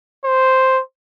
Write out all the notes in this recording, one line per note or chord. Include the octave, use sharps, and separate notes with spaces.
C5